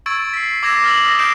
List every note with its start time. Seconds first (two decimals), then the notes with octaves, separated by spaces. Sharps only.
0.06 C#6 E6 G#6 A6 D7
0.33 B6 C7
0.63 D6 E6 G#6 A#6 C7 E7
0.84 E6 F6 A6 B6 F#7
1.06 D#6 A#6
1.19 D#6 G6 C7 D7 E7